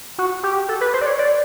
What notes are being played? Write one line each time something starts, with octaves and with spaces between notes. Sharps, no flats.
F#4
G4
A4
B4
C5
D5
C#5
D5